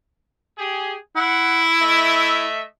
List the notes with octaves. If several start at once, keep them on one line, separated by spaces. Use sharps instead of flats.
G4 G#4
E4 F#5
A3 D#5 E5